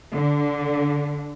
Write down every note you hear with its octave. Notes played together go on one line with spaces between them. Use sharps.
D3